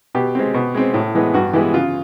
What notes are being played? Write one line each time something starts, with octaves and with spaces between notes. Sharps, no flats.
B2 G4
G#3 C4
B2
G#3 C4
A2
E3 G#3 B3
G2 F#4
E3 G#3 B3 G4
C#3 F4